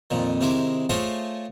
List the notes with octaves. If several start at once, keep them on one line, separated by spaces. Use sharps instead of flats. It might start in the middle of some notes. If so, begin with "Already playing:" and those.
F2 A#2 D#3
C3 D#3 G#3 E4 D6
A3 F4 G#4 C5 C#5 D#5